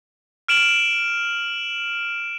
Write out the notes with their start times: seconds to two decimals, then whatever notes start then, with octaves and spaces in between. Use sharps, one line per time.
0.48 F6 D7 E7 F#7